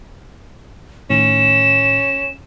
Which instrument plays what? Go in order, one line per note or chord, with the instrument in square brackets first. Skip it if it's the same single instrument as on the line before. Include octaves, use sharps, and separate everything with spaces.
[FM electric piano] A2 D#3 [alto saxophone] C#4 [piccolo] E7